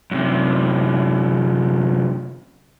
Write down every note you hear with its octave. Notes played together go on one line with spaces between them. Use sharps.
F#2 C3